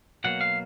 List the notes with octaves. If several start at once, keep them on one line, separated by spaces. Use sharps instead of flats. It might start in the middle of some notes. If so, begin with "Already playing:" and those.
B2 F#3 A#3 F#5
F5